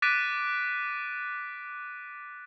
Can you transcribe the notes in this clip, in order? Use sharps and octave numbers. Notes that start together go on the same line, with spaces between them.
D6 F#6 A6 B6 D7 D#7